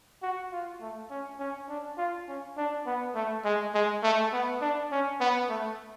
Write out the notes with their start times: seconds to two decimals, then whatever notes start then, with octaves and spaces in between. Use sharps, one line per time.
0.23 F#4
0.52 F4
0.81 A3
1.11 C#4
1.40 C#4
1.69 D4
1.98 F4
2.28 C#4
2.57 D4
2.86 B3
3.15 A3
3.45 G#3
3.75 G#3
4.03 A3
4.33 B3
4.61 D4
4.92 C#4
5.21 B3
5.49 A3